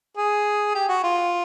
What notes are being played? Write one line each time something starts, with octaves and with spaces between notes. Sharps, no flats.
G#4
G4
F#4
F4